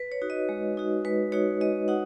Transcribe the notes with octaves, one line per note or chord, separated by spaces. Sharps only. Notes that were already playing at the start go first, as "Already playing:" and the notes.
Already playing: B4
C#5
D#4 F#4
D#5
G#3
D#4 F#4
G#3 B4
D#4 F#4 C#5
G#3 D#5
D#4 F#4 F#5